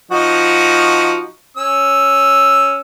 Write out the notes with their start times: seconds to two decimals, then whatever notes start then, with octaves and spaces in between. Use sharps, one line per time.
0.11 F3 D#4 F#4
1.57 C#4 E6